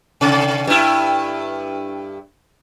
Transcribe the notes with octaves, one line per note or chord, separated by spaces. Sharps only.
C3
G2 E4